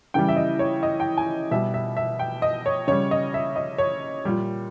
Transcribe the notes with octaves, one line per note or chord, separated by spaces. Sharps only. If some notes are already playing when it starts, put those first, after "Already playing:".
C#3 E3 G3 G5
E5
D#5
C#5
D#5
G5
G#5
B2 G3 E5
E5
E5
G5
D#5
C#5
C#3 G3 C#5
D#5
E5
D#5
C#5
A#2 G3